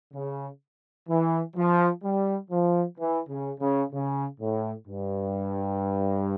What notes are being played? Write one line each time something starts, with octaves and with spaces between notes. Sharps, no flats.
C#3
E3
F3
G3
F3
E3
C#3
C#3
C#3
A2
G2